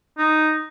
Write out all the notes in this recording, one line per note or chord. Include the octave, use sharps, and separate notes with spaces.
D#4